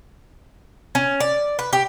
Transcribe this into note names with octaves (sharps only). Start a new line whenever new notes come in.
C#4
D5
B4
G4